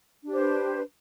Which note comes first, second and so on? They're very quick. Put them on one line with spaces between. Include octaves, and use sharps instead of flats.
D4 G4 C5 B4